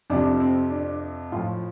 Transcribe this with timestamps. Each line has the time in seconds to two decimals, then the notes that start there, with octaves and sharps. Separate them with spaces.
0.10 F2 C3 F3 D4
0.40 C4
0.70 D4
1.32 A2 F3 F4